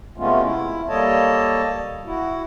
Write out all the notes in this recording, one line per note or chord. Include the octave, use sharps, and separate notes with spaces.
C3 G#3 A3 B3 C#4 F4
E4
G3 A#3 A4 C#5 D#5 A5
E4 F#4